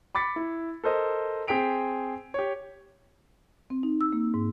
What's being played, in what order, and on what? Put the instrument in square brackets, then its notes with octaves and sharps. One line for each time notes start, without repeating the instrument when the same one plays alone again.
[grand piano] B5 D6 A6 B6 C#7
E4
A4 A#4 C5 D#5
C4 G#4 G5 B6 D7 F7
G4 C#5
[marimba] C4
D#4
E6
A#3
G#2